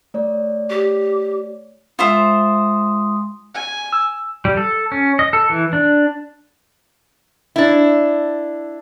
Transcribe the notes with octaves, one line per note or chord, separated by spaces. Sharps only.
A3 C#5 D5
G4
G#3 F4 C5 E5 C6 D#6
G#5
E6
G3
A4
C#4
D#5
A4
E3
D4
D4 E4